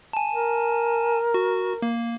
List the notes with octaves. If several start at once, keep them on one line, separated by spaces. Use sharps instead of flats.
G#5 A5
A#4
F#4
A#3